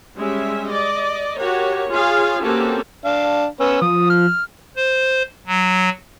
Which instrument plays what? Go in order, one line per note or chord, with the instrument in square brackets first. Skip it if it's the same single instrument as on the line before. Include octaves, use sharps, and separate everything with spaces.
[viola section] G3 G#3 C#4 E5
D5 D#5
F#4 G4 A#4 C#5
F4 G#4 C#5 F5
A#3 C4 C#4 F#4 G4 A4
[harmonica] D4 F5
[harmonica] B3 C#4 [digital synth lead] E6
[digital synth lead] F3 [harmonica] D#6
[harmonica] F6
[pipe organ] C5
F#3